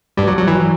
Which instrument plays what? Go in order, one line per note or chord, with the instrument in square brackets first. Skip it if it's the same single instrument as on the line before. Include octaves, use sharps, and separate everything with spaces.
[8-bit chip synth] G2 G3
F#3
F#3
E3